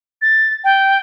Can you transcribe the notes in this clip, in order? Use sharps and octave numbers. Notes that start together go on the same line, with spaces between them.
A6
G5